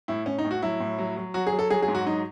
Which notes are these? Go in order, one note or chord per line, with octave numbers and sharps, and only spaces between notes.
A2 E4
A2 C#4
D#4
A2
F#4
F#3 E4
A2
F#3
F#3
F#3 F#4
G#4
F#3
A4
F#3 G#4
G#4
G#2
F#4
F#3 D#4